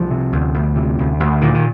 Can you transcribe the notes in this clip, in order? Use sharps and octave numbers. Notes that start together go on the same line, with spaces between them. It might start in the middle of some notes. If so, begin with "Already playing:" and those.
Already playing: C2 F3
C3
D2
D2
C3
D2
D2
A#2 D#3
D#3